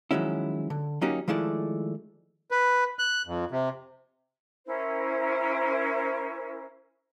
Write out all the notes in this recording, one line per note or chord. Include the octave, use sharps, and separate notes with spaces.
D#3 F3 F#3 G#3 C#4 E4
D3
F#3 A#3 C#4 D#4 F#4 G4
D#3 F3 G#3 A3 E4 D5
B4
F#6
F2
C3
C#4 E4 A#4 C5